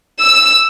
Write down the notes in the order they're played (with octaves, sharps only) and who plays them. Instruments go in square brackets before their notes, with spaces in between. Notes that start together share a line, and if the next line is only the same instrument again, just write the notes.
[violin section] E6